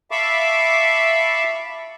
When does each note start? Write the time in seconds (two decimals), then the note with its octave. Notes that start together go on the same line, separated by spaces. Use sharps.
0.11 E5 F5 A5 B5 C#6 D6